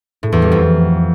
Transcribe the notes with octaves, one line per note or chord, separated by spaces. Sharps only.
A2
E2
G3
F2